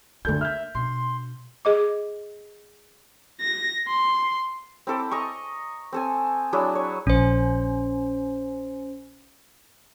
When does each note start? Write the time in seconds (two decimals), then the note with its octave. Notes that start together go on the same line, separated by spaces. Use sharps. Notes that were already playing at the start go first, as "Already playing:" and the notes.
0.25 D2 A#3 D4 A4 G6
0.41 E5 F6 G6
0.75 B2 D4 C6
1.65 G#4 D#5 D6
3.41 A#6
3.88 C6
4.87 C4 E4 A4 D6
5.11 D#5 A#5 C#6
5.93 C4 A4 G#5
6.53 F#3 D4 E4 G#4
6.75 C#5
7.07 A#1 C#4 C5